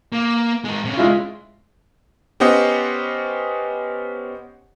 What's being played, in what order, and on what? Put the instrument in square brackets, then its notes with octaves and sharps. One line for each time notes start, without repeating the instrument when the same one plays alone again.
[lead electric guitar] A#3
G#3 A#4
C3 C#4
[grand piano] G#3 E4 F4
[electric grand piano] B3 C#4 G4 C5 D#5 F#5